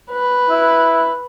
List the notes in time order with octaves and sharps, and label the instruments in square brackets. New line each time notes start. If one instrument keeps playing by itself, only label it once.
[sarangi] B4
[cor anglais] E4